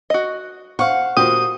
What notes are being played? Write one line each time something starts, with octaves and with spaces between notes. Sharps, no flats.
F#4 D#5
C5 F5 F#5 C#6
A#2 F#4 G4 C5 D#6